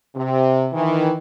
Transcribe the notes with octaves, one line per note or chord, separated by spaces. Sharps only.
C3
D#3 E3